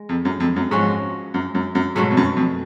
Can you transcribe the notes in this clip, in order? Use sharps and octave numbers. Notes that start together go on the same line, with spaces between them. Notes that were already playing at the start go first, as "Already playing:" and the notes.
Already playing: G#3
F2
F#2
F2
F#2
G#2 F3 G#3 C#4 F#4
F#2
F#2
F#2
G#2 B2 F#3 A3
F2
F#2
F2